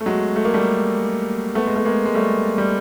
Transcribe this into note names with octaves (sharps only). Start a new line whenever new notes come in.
A3
F#3 G#3
A3
A#3
G3 A3
A3 B3
G#3
A3
G#3 A#3
G#3
G3 A3
G3